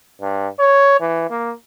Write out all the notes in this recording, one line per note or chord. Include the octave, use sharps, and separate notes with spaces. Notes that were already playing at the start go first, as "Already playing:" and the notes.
G2
C#5
E3
A#3